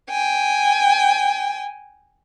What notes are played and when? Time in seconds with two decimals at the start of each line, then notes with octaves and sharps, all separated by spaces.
0.10 G5 G#5